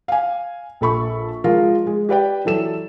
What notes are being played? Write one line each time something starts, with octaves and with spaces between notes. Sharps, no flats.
F5 G#5
A#1 A4 B5 C#6
F3 G#3 F4 A#4
G#3
G4 B4 D5 G5
E3 F#3 A4 E7